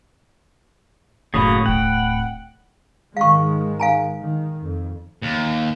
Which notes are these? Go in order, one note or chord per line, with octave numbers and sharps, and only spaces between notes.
F#1 A2 C#3 F#3 A#3 B5 D#6
D1 C4 F#5 G5
G#2 D#3 G#3 F5 C#6
F5 G#5 A#5
D#3
F2
D#2